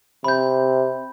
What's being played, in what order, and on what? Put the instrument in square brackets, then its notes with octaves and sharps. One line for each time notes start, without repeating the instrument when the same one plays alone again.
[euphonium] C3 [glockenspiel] B5 G6